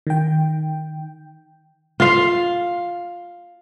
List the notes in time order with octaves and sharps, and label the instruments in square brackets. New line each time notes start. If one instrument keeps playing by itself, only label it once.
[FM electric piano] D#3 G5
[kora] F4 F5